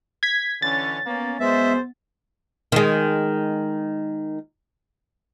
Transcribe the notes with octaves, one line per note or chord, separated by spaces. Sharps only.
G#6 B6
D3 E3 C#4 A6
A#3 B3 C#4
F#2 G#3 B3 G#4 C5 E5
D#3 G#3